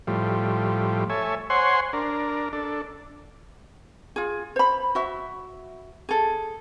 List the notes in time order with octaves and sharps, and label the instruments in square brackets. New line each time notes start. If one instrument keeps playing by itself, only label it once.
[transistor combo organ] A2 F3 G3
A4 C#5 E5 G#5
C5 C#5 F#5 G#5 C6
D4 A#4
D4 A4
[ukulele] F4 G#4
C5 B5
F#4 E5
G#4 A4